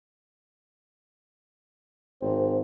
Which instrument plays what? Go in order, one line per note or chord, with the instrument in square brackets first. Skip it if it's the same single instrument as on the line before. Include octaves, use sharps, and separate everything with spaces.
[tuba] G#1 [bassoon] C4